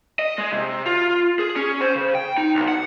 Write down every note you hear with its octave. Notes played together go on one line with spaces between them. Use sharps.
D#5
G#3
C3
F4
G#4
C#4
C5
C#3
G5
D#4
B1
F#5